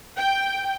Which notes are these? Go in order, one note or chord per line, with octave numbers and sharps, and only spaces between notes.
G5